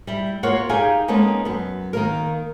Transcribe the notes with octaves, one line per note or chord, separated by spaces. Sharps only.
G3 E4
A#3 F4 F#4 C#5 F#5
D#4 G4 G#4 F5 G#5
G#3 A#3 B3 C#4 D#4 A4
F#2 B3
D#3 A#3 A#4